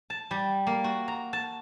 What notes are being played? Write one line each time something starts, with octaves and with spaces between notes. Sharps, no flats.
A5
G3
A#3
F#4
A#5
A5